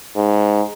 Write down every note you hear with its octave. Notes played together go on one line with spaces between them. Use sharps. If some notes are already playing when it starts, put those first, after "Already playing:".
G#2